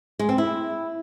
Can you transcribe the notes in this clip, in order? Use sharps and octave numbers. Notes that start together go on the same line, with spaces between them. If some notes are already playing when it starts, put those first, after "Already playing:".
G#3
C4
E4